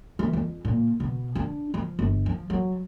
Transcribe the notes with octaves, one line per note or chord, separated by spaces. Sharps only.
E3
F2
A#2
B2
D4
F3
G1
F3
F#3